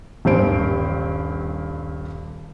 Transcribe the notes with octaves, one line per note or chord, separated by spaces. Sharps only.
D#1 G2 C5 D7